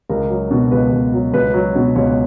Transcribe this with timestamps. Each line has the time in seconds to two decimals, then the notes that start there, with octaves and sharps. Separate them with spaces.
0.09 C#2 A#4
0.30 F#3
0.51 B2
0.71 C#2 B4
0.92 C#2
1.14 F#3
1.34 C#2 B4
1.54 F#3
1.75 B2
1.96 C#2 C#5